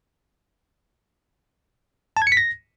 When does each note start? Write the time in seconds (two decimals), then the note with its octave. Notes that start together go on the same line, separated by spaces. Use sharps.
2.17 A5
2.22 G#6
2.27 C#7
2.32 B6
2.37 A#6